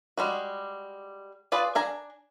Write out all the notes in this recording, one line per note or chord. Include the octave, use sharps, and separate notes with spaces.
G3 G#3 F#4
F4 G#4 B4 D5
D4 G#5 A#5